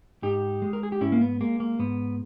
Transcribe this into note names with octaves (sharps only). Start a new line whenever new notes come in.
G#2 D#4 G4
G#3
A#4
G#4
G4
G#2 C#4 E4
A#3
B3
G#3 A#3
A#3
G#2 B3